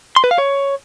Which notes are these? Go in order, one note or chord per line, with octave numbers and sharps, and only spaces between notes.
C6
B4
F5
C#5